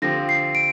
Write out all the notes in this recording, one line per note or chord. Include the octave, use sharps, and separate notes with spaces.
D3 F3 C4 G4 A#6
C7
D7